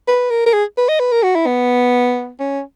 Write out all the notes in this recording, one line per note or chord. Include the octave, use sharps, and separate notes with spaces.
B4
A#4
A#4
G#4
B4
D#5
B4
A#4
F#4
E4
B3
C#4